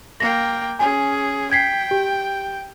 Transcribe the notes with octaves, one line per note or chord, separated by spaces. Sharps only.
A#3 G5 A#6
C#4 G#4 G#5
G5 G#6 B6 C7
G4